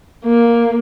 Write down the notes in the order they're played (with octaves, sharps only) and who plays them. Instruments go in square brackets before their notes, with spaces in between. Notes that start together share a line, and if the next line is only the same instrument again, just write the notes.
[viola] A#3